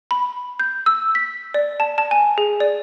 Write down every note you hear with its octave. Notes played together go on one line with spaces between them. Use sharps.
B5
G6
E6
B6
D5
A5
A5
G#5
G#4
D5